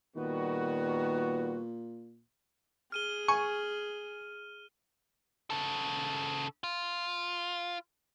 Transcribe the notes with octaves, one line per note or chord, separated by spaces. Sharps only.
A#2 D#3 G3 B3 F#4
G#4 F6 D#7 G7
G#5 C#6
C#3 A4
F4